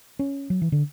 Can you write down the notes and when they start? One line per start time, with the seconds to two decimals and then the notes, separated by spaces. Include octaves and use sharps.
0.19 C#4
0.50 F#3
0.62 E3
0.72 D3